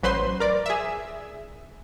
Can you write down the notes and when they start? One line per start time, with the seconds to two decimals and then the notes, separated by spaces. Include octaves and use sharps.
0.03 A1 F#3 B4 C5 C6
0.40 A#4 D5
0.66 G#4 E5